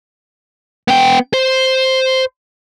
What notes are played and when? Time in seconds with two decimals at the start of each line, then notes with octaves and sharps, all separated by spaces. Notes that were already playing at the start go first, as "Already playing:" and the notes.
0.88 B3 G5
1.34 C5